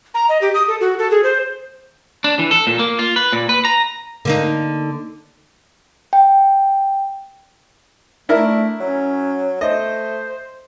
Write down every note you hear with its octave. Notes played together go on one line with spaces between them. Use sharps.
A#5
D#5
G4
D#6
A4
F#4
A4
G#4
C5
D4
E3
A4
A#2
A#3
F4
B4
A#2
B4
A#5
D3 A#3 D#4
G5
A3 D4 E4 A#4
F#3 C#4
A3 C5 D#5